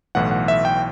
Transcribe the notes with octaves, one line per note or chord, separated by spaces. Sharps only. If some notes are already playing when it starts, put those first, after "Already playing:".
B1 A2 E3 F#5
F#5
E5
G5